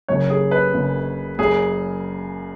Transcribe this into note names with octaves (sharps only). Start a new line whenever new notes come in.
F#1 F#2 C#3 C#5
G#4
B4
F#1 F#2 C#3
F#1 F#2 C#3 G#4